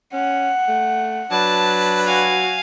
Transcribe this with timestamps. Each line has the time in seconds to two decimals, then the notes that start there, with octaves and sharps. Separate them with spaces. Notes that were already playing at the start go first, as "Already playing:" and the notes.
0.13 C#4 F#5
0.68 A3
1.31 F#3 D4 B4 A5
2.06 F#4 F5 G#5